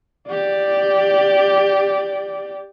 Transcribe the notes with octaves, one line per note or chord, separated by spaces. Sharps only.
G4 D5